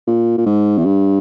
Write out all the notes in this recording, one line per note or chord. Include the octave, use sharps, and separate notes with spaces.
A#2
A#2
G#2
E2
G2